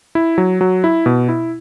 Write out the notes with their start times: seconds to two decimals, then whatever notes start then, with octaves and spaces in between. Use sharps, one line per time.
0.15 E4
0.38 F#3
0.61 F#3
0.84 E4
1.06 B2
1.29 E4